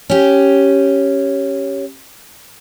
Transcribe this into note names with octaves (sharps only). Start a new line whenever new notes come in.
C#4 G4